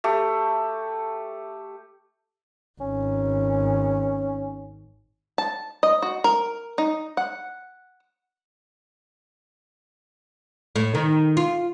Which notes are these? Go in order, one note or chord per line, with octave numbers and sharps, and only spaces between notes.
A3 G4
G#1 C#4
A5
D#5
F#4
A#4
D#4
F#5
A2
D#3
F4